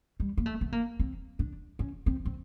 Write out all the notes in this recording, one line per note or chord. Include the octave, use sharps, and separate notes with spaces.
G3
A#3
A3
B3
A#3
C4
D4
C#4
C4
C4